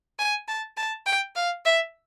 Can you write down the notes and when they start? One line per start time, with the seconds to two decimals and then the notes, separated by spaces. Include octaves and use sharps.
0.19 G#5
0.48 A5
0.77 A5
1.06 G5
1.36 F5
1.65 E5